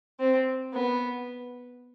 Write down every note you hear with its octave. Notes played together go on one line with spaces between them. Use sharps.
C4
B3